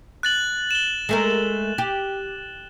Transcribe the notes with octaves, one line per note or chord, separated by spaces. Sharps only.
F#6 A6 F#7
E7 G7
G#3 A3 A#4
G4